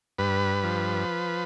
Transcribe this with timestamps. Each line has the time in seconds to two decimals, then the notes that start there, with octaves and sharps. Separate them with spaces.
0.18 G2 B4
0.64 F3